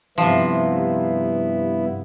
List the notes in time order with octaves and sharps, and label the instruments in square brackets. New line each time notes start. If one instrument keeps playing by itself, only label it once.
[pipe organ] G2 B3 E4 [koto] C3 F3